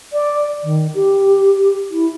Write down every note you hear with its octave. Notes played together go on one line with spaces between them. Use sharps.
D5
D#3
G4
E4